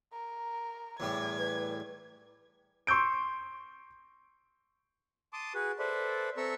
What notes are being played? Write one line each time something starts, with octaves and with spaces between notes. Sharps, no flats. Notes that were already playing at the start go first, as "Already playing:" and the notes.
A#4
E2 A2 G3 G#6
B4
C6 C#6 E6 G6 D7
A5 C6 D6 D#6
F#4 G#4 B4
A4 B4 C5 D5 E5
C4 A4 E5 A#5 C#6 E6